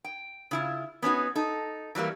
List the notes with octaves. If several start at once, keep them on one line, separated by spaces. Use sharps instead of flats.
G5
C#3 E4 F4
B3 C#4 D#4 F#4
D#4 A4
E3 F#3 G3 A#3